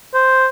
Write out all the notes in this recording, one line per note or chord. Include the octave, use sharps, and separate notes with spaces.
C5